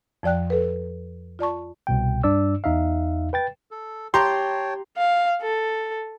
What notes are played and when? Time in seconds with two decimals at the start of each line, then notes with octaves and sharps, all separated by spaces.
0.23 F2 F3 D5 G5 F#6
0.50 A4 B4
1.39 F4 D5 A5 C#6
1.87 C2 B2 G5
2.23 G2 D4 D5 E6
2.64 E2 D#4 E5 F5
3.33 B4 G5 A6
3.71 A4
4.14 G4 C#5 G5 A5 A#5 C6
4.97 F5
5.42 A4